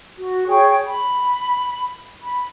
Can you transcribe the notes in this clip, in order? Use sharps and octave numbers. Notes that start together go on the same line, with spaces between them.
F#4
G#4 C#5 G5 C#6
B5
B5